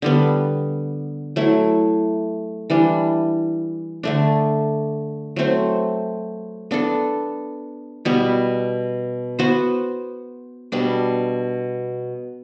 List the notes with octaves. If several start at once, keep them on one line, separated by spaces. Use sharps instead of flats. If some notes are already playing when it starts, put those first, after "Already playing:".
D3 G3 B3
F#3 A3 E4
E3 G3 D4
D3 A3 D4
F#3 A3 C4
B3 D4 A4
B2 G3 B3
B3 F#4 C5
B2 G3 D4